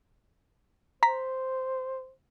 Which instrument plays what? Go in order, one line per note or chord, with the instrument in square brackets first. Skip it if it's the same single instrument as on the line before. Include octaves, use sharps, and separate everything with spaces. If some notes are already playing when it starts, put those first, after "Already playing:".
[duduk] C5 [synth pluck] A#5 B6